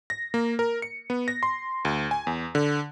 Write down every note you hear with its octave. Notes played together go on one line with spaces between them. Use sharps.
A#6
A#3
A#4
C#7
B3
A#6
C6
D2
G#5
E2
D3